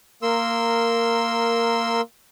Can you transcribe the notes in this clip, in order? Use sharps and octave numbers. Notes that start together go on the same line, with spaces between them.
A#3 A#4 C6 E6